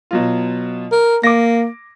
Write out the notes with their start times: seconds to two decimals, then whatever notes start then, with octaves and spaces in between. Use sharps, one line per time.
0.11 B2 F#3 F4
0.92 A#4
1.23 A#3 D6 A#6